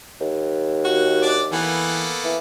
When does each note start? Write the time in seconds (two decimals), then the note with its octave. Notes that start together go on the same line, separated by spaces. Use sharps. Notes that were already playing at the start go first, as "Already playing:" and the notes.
0.21 D#2
0.85 F#4
1.22 D4 D6
1.52 E3 A#3 B3 A4
2.25 E3